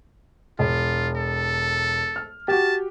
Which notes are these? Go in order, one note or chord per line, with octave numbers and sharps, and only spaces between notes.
E1 F4
A4
F6
F#4 G4 A5